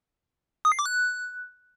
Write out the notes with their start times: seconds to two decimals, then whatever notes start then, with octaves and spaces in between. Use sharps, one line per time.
0.65 D#6
0.72 C7
0.79 D6
0.86 F#6